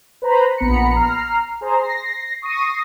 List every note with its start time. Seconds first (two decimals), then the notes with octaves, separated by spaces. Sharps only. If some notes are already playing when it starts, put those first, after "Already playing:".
0.22 B4 C5 A#5 B5
0.58 A#1 B3 A#5 B5 C#7
0.96 A#5 F6 C7
1.61 G#4 C5 A#5
1.79 A#6 C7
2.42 C#6 D#6 A#6 C7 D#7